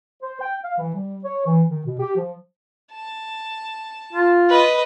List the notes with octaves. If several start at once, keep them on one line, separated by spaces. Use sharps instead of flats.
C5
G5
F5
E3
G3
C#5
E3
D#3
B2
G4
F3
A5
F4
B4 D#5